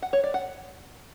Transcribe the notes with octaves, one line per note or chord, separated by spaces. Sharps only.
F#5
C#5
D5
F#5